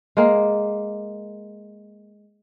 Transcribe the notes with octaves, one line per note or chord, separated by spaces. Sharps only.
G#3 A#3